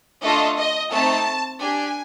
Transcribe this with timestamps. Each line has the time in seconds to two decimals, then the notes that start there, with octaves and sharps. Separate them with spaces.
0.22 A3 D4 F4 A4 D#5
0.57 D#5
0.91 A3 C4 D#4 A5
1.60 D4 G4 G#5